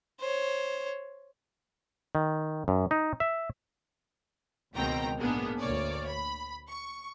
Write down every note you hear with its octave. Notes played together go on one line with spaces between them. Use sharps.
C5 C#5
D#3
F#2
D#4
E5
C#2 B2 D#3 C4 G5 A#5
A#1 G#2 A#3 B3 D4 G#4
D2 A#3 C#5 D5
B5
C#6